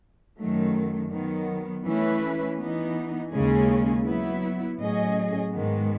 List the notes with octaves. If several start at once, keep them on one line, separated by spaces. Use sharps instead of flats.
F#2 D#3 F#3 A3
D#3 F#3 B3
E3 A3 C#4 E4 B4
E3 B3 D#4
D#2 C#3 G#3 C#4 G#4
F#3 B3 E4
A2 F#3 C#4 G#4 D#5
G#2 D#3 G#3 B3